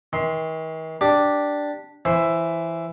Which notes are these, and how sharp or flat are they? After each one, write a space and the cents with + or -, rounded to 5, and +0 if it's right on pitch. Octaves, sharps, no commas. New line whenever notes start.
D#3 +45 C6 +0
D4 +0 G4 +0
E3 +10 C5 +0 E5 +10